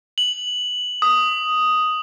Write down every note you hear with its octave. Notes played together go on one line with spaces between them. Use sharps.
F#7
D#6